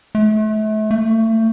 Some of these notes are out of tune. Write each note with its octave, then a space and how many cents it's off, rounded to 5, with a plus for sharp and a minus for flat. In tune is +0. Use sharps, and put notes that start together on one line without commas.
A3 -35
A3 +30